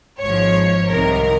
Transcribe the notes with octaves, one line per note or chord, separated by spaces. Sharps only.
G#1 G#2 F3 C#5
C2 C3 D#3 A#4